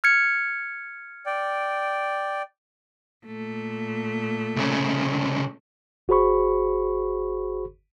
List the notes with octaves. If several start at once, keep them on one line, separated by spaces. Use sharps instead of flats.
F6 G#6 C#7
D5 G5
A#2 A3
C2 C#3
G1 F#4 G#4 C5 B5 C#6